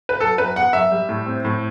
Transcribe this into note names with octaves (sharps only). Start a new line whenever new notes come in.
B4
F#3 A4
F#2 B4
B3 F#5
F#2 E5
G3
A2
C4
A2